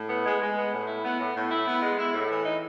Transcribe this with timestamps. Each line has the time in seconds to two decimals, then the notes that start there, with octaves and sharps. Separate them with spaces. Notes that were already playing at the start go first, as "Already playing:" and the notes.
Already playing: A2
0.09 B3
0.25 G#3
0.41 G#3
0.56 B3
0.72 A2
0.87 E4
1.04 B3
1.19 A2
1.35 A2
1.51 E4
1.66 B3
1.82 G#3
1.98 E4
2.14 A2
2.29 E3
2.45 D#4